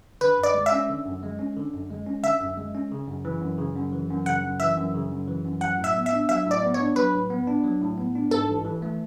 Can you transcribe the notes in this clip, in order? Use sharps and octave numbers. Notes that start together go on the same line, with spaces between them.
D3 B4
F#2
D5
G#3
E5
C#4
D3
F#2
G#3
C#4
D3
F#2
G#3
C#4
D3 E5
F#2
G#3
C#4
C#3
F#2
E3
F#2
C#3
F#2
E3
F#2
C#3 F#5
F#2
E3 E5
F#2
C#3
F#2
E3
F#2
F#3 F#5
A2
E5
B3
E5
D4
F#3 E5
A2
D5
B3
C#5
D4
F#3 B4
A2
B3
D4
F#3
A2
B3
D4
G#2 A4
A1
E3
A3